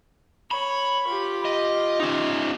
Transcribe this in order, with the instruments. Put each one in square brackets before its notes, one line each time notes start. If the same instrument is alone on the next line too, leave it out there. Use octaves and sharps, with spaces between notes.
[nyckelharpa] C#5 [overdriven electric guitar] B5
[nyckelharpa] F4 G4
[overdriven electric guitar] D#5
C#4 D#4